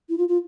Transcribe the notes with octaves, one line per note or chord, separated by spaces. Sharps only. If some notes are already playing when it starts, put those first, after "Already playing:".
E4
F4
F4